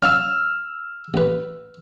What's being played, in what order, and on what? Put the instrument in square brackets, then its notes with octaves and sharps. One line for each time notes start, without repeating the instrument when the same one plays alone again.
[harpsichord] C#4 F5 A5 [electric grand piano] E6 F6
[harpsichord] A1 B4